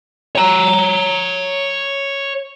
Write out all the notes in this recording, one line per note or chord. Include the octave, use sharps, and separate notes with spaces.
C#5 A#5